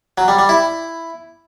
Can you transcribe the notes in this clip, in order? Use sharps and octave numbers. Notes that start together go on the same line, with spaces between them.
F#3
G3
G3
E4